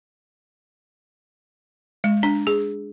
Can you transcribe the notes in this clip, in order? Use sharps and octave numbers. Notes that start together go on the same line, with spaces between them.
G#3
D4
G#4